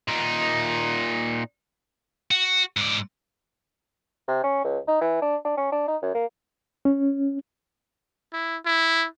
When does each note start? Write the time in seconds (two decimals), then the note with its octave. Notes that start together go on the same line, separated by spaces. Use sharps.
0.08 A#2 D#4
2.31 F#4
2.77 G#2 D5
4.28 C3
4.43 C#4
4.64 C#2
4.87 D#4
5.01 E3
5.22 D4
5.45 D4
5.57 C#4
5.72 D4
5.88 D#4
6.02 F#2
6.14 A#3
6.85 C#4
8.33 E4
8.66 E4